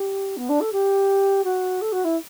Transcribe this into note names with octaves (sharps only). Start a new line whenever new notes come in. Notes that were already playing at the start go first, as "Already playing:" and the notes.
Already playing: G4
B3
D4
A4
G4
F#4
A4
F#4
E4